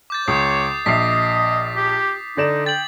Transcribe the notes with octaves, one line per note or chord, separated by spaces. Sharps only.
D6 G6 A6
C#2 C#5 D#6 C7
A#1 D#5 E5 B6 C7
G4
D3 D#4 D5 E7
G5 A6 F#7